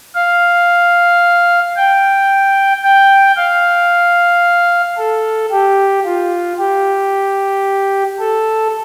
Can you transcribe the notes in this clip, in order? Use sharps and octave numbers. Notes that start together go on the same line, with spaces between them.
F5
G5
G5
F5
A4
G4
F4
G4
A4